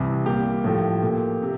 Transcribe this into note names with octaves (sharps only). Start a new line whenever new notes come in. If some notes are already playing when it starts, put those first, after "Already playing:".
Already playing: C2 C3 E3
A#2 G3 A#3 G4
A2 F3 A3
A#2 A3
C3